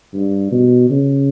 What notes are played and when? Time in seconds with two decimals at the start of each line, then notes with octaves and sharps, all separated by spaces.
0.14 G2
0.52 B2
0.90 C#3